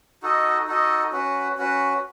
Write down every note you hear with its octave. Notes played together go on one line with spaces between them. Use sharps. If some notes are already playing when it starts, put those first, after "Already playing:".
D#4 F#4 A4 D#5
D#4 F#4 A4 D#5
C#4 F#4 B4
C#4 F#4 B4